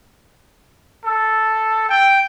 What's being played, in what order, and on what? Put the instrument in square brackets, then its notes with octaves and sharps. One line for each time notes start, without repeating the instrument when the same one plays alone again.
[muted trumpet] A4
G5